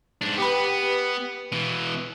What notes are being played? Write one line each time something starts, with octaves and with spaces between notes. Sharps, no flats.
G#2 D4
B3 G4 B4
B2 E3